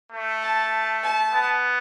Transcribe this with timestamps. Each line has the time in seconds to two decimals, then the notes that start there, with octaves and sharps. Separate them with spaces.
0.11 A3
0.42 A5
1.03 A5
1.33 B3